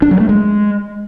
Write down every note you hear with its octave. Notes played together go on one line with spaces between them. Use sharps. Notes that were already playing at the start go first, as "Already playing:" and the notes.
D4
F#3
A3
G#3